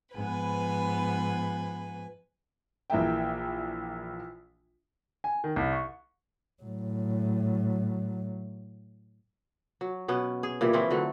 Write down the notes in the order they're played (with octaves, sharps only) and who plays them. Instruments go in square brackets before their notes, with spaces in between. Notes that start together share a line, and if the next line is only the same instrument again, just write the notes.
[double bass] G#2 B3 [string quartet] F3 B4 G#5
[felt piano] A#1 E3 A#3 E5 G5
[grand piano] G#5
D#3
C2
C#6
[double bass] A2 F#3
[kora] F#3
B2 B3 C#4
G#4
A#2 C#3 E3 G3
E3 F3 C4 C#4
D3 F#3 A3